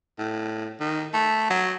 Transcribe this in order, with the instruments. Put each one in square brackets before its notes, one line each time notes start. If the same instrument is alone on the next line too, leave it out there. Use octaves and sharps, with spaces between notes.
[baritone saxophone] A2
D#3
A3
F#3